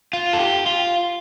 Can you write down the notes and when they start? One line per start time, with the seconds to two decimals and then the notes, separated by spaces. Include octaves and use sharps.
0.13 F4
0.33 A4
0.39 G4
0.66 F4